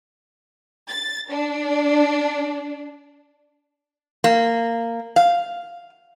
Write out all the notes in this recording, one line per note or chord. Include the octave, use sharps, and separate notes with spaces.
A6
D4
A#3
F5